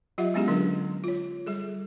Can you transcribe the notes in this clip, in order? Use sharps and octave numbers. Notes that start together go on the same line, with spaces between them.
F#3 F4 G4 D#5 E5 F#5
G#3 B3 C#4 E4 G4 G#4
D3 F#3 D4 A4 A#4
F4 C#5
G3 G#4 A4